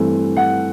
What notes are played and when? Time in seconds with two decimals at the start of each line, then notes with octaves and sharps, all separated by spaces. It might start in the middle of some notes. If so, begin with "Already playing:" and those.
Already playing: G2 E3 A3 C4
0.37 F#5